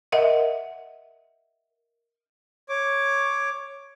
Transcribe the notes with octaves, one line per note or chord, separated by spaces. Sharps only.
A#4 D#5 E5 F#5
C#5 D6